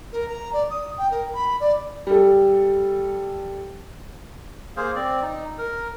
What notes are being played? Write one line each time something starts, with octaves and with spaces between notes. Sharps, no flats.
A#4
A#5
D5
D#6
G5
A#4
B5
D5
G3 A4
A#3 G#4 C5 F5
C4 D5
D#4
A#4